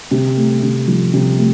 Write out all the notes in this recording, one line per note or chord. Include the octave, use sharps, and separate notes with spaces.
C3
A3
C3
F3
C3
A3